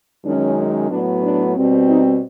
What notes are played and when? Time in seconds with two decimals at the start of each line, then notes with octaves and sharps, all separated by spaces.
0.24 F#2 D#3 G#3 C#4 D4
0.57 C#4
0.89 A2 F#3 B3 D4
1.23 D4
1.55 B2 G3 C4
1.89 D#4